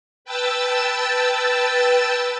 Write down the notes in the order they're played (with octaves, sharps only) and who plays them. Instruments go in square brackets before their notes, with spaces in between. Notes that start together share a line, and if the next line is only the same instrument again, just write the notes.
[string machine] B4 G5 A5 E6 A6